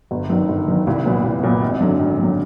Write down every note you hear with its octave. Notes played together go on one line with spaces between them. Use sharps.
G1
F#2 D#3
G1
F#2 D#3
C2
A#2 F#3 B3
C2
A#2 F#3 B3
G#1
F#2 D3 F#3
G#1
F#2 D3 F#3